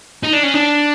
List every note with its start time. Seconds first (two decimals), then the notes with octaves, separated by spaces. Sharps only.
0.23 D#4
0.33 D4
0.43 C#4
0.54 D4